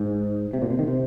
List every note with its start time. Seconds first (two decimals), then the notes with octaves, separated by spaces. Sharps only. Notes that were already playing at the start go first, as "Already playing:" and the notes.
Already playing: G#2
0.53 C3
0.62 A#2
0.70 C3
0.79 D#3
0.87 C3